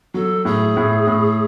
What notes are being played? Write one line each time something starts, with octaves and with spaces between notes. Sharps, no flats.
F#3 A4
A2 G#4
A2
A2